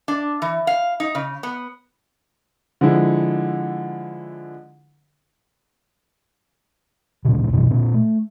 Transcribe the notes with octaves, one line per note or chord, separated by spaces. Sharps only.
D4
E3
F5
D#4
C#3
B3
D3 F3 G#3 E4
D1 A1 A#2 C#3
F#2 B2 D#3 E3
A#2 C4 D4
A3